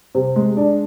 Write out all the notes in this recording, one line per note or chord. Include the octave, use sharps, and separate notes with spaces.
C3
G#3
D4